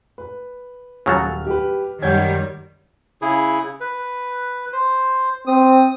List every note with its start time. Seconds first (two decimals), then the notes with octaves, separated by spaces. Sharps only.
0.18 B4
1.06 D#1 C#3 F#3 A4 F6
1.47 G4 B4
2.02 F#2 D#3 G3 C#5 F#5 G6 G#6
3.22 C#3 E4 G#4
3.81 B4
4.73 C5
5.47 C4 D#6